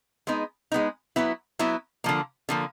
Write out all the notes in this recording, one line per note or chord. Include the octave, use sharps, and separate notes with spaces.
G#3 B3 D#4
G#3 B3 D#4
F#3 B3 E4
F#3 B3 E4
D3 F3 A#3
D3 F3 A#3